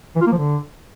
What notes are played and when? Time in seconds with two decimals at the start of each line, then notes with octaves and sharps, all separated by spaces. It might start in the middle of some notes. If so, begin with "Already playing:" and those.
0.16 E3
0.21 F4
0.27 A#3
0.32 F3
0.38 D3